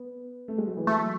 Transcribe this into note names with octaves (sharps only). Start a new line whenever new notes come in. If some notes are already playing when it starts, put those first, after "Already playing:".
Already playing: B3
A3
G#3
F#3
E3
F#3 A3